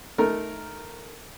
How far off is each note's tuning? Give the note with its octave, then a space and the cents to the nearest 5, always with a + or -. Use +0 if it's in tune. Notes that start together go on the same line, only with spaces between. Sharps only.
A3 -20 D#4 +0 A#4 +0